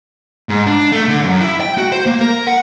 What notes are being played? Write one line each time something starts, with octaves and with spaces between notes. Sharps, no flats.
G#2
D4
A3
D3
F#2
E4
G5
F#4
C5
A#3
A#4
F#5